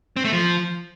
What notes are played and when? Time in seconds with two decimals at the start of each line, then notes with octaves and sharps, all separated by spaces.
0.17 C4
0.25 A3
0.33 F3